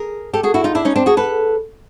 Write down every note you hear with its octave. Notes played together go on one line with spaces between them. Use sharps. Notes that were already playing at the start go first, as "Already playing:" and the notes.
Already playing: G#4 A#4
G4 A4
F#4 G#4
E4 F#4
D#4 F4
D4 E4
C#4 D#4
C4 D4
F#4 G#4
A4 B4